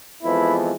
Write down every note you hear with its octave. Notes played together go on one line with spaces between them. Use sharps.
F2 E3 G#3 B3 E4